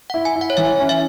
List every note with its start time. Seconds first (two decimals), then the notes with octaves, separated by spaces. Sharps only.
0.10 E4 F#5
0.25 G#5
0.36 E4
0.41 F#5
0.50 C#5
0.57 E3 E5
0.79 C#4
0.89 E5